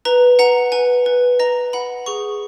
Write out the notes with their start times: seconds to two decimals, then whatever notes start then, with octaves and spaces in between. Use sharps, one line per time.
0.05 B4 A#5
0.39 F#5 A#5
0.72 B4 G#5
1.06 B4
1.39 D#5 A#5
1.73 F#5 B5
2.06 G#4 C#6